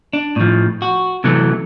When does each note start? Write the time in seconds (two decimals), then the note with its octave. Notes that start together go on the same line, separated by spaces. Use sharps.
0.13 D4
0.36 A2 F3
0.82 F#4
1.24 C3 E3 F#3 A3